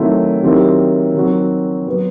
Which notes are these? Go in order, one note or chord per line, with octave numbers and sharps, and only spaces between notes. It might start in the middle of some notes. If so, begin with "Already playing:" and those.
Already playing: D#3 F#3 A3 C4 E4
D#3 F#3 C4 E4 G4
D#3 F#3 C4 F#4
F#3 B3 F#4